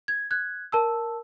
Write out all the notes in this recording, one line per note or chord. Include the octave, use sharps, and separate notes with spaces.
G#6
F#6 G#6
A#4 A5 E6